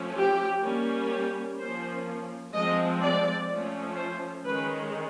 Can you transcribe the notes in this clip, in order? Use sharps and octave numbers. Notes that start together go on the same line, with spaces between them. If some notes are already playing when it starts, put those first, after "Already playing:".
Already playing: F3 A3 C#4
G4
G3 A#3 C#4
G4
F3 A#3 C#4 C5
F3 G#3 C4 D#5
D5
F3 A3 C#4
C5
D#3 G#3 C#4 B4